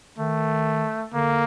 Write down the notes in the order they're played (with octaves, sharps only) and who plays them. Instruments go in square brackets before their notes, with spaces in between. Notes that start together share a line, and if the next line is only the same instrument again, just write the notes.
[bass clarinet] D#3 [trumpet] A3
[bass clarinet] D3 [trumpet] A#3